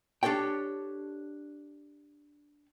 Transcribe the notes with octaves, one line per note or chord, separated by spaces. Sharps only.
D4 G4 A4 C#5 G5